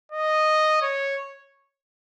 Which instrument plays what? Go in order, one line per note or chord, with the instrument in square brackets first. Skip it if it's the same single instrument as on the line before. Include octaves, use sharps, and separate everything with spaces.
[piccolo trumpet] D#5
C#5